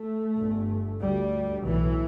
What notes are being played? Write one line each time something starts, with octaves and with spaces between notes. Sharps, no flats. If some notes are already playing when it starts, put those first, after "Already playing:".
Already playing: A3
G1 G2
D2 G3
B1 A2 E3